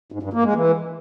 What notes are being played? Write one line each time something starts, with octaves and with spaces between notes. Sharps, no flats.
G#2
G2
A#3
G#3
E3